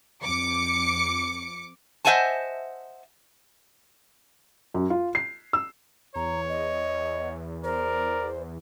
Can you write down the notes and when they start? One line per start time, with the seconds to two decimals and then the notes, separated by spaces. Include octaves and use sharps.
0.23 F2 D6 C#7
2.05 C5 D#5 E5 F#5 G#5 A5
4.74 F#2
4.90 F4
5.15 C7
5.53 E6
6.15 E2 C#5 A#5
6.49 D#5
7.64 A#4 C5 D5